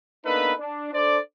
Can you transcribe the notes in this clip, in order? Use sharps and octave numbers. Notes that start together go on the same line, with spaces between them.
A#3 B3 D4 D#4 A4 B4
D4
D4 A4 C5 D5